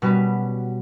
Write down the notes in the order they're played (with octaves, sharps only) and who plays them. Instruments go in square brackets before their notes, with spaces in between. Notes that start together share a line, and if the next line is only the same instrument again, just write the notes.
[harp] B2 G3 C#4 F#4 B4